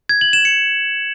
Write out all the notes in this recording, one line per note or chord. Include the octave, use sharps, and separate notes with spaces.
G#6
F#7
E7
C#7